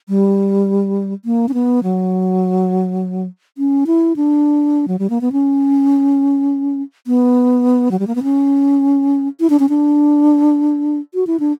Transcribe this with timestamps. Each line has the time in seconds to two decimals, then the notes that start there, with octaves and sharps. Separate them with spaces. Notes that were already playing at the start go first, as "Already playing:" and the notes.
0.09 G3
1.25 A#3
1.49 C#4
1.54 B3
1.83 F#3
3.58 C#4
3.87 E4
4.16 D4
4.88 F#3
4.99 G3
5.10 A#3
5.21 B3
5.32 C#4
7.07 B3
7.91 F#3
7.99 G3
8.07 A#3
8.15 B3
8.23 C#4
9.40 E4
9.50 D4
9.59 C#4
9.69 D4
11.14 F#4
11.27 E4
11.40 D4